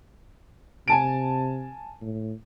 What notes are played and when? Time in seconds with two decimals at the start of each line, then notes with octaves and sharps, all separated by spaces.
0.88 C3 G#5 A5 D7
2.01 A2